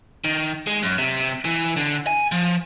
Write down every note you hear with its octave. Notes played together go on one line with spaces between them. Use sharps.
D#3
G#3
F#2
C3
E3
D3
G#5
F3